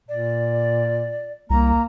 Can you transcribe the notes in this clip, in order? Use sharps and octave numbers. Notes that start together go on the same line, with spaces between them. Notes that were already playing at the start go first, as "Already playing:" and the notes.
A#2 D5
C2 A#3 A#5